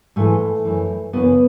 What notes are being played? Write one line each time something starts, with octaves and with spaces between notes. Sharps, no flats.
G#2 E3 A3
F#2 E3
F#2 C#3 E3 B3